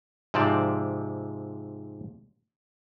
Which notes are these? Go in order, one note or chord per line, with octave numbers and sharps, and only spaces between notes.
G#2 C3 F3 C4 D5 A5